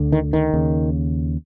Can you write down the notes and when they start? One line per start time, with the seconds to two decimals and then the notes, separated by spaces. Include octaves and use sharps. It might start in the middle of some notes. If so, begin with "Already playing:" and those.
Already playing: D2 D3
0.12 D#3
0.33 D#3
0.54 D#2 C#3